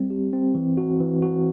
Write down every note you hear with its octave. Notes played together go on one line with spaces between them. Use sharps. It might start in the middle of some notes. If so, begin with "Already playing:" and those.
Already playing: G3 C4
G4
C4
E3
F#4
E3
F#4